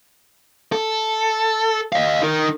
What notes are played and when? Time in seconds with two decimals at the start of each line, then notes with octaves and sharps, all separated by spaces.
0.72 A4
1.93 D#5 F5
2.22 D#4 A#4